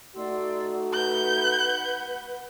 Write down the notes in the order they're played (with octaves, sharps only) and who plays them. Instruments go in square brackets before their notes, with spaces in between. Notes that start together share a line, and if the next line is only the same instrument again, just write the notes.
[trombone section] A3 D#4 F#4 [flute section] D5 C6 E6
[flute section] B4 F#5 [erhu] G6